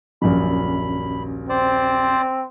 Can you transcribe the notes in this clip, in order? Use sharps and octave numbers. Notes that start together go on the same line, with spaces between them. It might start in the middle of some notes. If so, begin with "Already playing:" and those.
D#1 A#1 F#2 B5
C4 C5 D5